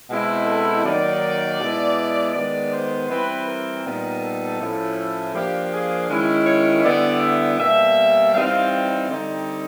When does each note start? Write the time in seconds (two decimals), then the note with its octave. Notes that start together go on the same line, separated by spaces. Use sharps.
0.09 B2 G#3 C4 E4
0.46 A4
0.84 D#3 F#3 A#3 D#4 D5
1.59 B2 G#3 B3 E4
2.34 D#3 G#3 B3 D5
2.71 C5
3.09 E3 G3 C4 B4
3.46 A#4
3.84 A#2 G3 B3 D#4
4.22 A4
4.59 A2 F3 A3 C#4 E4
5.34 F3 A#3 D4 G4
5.72 G#4
6.09 D#3 G#3 C#4 E4
6.47 C#5
6.84 D3 G3 B3 E4 D5
7.21 E5
7.59 B2 G3 A#3 E5
8.34 E3 G3 C4 D#4 F5
8.72 F5
9.09 D3 G3 C4 D#4